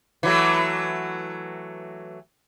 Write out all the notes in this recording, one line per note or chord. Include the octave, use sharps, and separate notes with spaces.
E3 F#3 A3